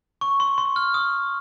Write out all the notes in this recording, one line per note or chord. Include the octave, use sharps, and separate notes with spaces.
C#6
C6
C6
F6
D#6